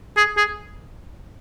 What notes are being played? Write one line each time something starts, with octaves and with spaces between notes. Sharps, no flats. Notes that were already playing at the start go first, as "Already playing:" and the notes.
G#4
G#4